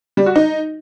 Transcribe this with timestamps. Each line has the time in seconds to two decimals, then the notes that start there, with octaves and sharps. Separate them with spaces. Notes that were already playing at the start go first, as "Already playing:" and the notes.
0.17 G3
0.26 F#4
0.36 D#4